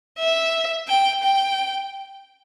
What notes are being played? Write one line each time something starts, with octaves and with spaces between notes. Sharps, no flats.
E5
G5
G5